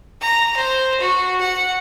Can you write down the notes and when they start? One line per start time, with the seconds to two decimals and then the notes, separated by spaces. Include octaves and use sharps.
0.21 A#5
0.56 C5
1.00 F#4
1.41 F#5